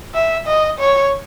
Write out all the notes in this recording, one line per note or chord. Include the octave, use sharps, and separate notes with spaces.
E5
D#5
C#5